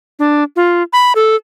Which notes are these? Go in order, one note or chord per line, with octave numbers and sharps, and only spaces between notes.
D4
F4
B5
A4